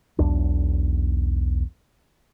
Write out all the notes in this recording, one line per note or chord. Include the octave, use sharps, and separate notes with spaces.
B1 E2 D4